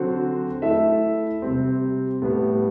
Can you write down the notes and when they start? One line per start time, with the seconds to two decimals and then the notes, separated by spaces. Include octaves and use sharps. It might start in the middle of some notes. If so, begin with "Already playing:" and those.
Already playing: D3 F#3 C4 F#4 C5
0.62 A3 E4 A4 E5
1.42 C3 G3 C4
2.22 A2 G3 B3